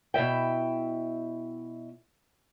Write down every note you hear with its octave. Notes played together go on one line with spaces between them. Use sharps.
B2 E4 E5 G5